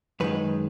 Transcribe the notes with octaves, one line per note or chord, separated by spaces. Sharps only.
F#2 D#3 G#3 B4